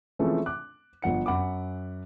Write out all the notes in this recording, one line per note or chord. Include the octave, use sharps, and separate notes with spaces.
E3 F3 G#3 A3 C4 C#4
D6 F#6
G1 F3 F#5 C#7
F#2 F#5 B5 D6